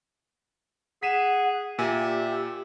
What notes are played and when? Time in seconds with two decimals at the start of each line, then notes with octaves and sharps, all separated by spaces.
1.03 G#4 F#5 B6 D#7 E7
1.79 A#2 G4 E5 G#5 D#7